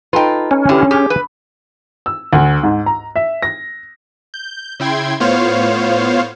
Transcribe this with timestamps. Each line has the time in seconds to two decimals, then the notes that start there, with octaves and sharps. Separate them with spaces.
0.13 D#4 F4 A4 B4 G5
0.51 C#4
0.69 D3 E4 G4 B4
0.91 G4 G#4 G#5
1.10 B4
2.06 E6
2.33 D2
2.63 G#2
2.86 A#5
3.16 E5
3.42 A#6
4.34 G6
4.80 C#3 E4 G5 C6 G#6
5.20 A2 B3 F4 C5 C#5 F5